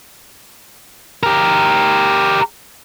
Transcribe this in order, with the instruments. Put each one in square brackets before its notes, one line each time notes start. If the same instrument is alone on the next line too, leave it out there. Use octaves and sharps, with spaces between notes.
[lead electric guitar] G4 A#4